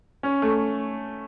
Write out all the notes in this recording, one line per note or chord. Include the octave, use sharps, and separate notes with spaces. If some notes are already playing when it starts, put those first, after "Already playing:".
C#4
A3